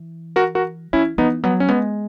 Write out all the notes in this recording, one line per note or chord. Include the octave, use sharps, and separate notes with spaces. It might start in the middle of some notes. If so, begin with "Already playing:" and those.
Already playing: E3
F#4 A#4
F#4 A#4
E3 C#4 E4
E3 B3 D#4
F#3 B3
C#4
G#3 B3